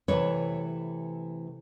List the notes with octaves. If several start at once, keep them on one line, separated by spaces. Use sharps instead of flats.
C3 E3 A3 B4 C#5